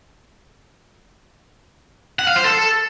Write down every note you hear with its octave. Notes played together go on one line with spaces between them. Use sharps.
F#5
F5
C5
A4